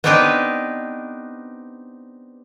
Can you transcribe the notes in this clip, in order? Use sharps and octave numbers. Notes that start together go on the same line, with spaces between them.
B3 C4 D4 D#4 G4 B4